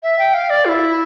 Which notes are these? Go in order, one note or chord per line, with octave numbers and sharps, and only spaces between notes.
E5
G5
F5
D5
F4
E4